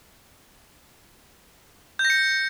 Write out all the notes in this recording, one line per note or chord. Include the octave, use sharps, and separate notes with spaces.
G6
A#6
C#7